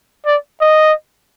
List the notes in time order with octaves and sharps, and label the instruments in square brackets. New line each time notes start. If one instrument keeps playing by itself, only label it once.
[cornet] D5
D#5